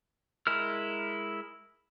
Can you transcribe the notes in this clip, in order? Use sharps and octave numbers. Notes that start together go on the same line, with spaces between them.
G#3 E4 A#4 F6